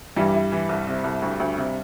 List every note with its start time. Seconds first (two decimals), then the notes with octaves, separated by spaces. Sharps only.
0.16 G2 E3 G3
0.34 E4
0.52 E3
0.69 C2
0.88 C3
1.04 C2
1.22 D2
1.40 D2
1.57 C3